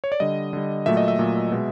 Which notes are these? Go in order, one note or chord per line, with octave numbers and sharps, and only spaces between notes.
C#5
D5
D3 G3 D#5
D3 G3
A#2 F#3 A3 E5
D#5
E5
A#2 F#3 A3
B2 G#3